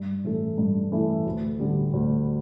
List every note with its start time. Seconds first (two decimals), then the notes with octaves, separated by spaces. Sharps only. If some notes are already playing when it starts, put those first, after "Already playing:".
Already playing: G2
0.24 E3 A3 E4 A4
0.58 G2
0.92 E3 A3 E4 A4
1.26 D2
1.60 D3 G3
1.93 D2